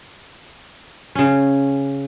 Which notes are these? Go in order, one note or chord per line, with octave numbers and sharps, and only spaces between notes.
C#3 C#4